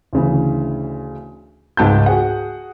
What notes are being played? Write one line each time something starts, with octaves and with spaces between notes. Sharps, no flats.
D2 C#3 E3
C#2 G#2 A5 G6
F#4 G#4 F#5